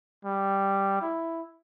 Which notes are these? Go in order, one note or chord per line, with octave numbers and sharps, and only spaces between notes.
G3
E4